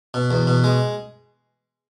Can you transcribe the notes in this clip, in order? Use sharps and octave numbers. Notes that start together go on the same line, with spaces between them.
B2
E2
B2
G#3